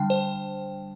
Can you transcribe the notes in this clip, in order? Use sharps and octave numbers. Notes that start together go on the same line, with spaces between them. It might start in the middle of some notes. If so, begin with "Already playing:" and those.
Already playing: D3 G3 D4 G5 A5
C5